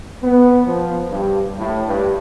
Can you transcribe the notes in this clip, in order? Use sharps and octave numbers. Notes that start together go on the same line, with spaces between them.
B3
F3
G2
A2
G2